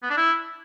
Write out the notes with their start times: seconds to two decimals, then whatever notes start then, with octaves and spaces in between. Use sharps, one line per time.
0.03 B3
0.10 D4
0.17 E4